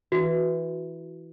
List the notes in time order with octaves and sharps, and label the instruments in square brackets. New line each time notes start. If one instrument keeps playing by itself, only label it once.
[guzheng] E3 [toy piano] F#4